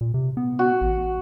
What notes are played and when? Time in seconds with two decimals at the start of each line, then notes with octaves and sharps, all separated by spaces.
0.01 A#2
0.14 C3
0.37 B3
0.59 F#4
0.81 A1